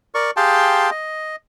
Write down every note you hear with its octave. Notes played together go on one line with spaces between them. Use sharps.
A#4 D5 C#6
G4 G#4 F5 G5 A5 C6
D#5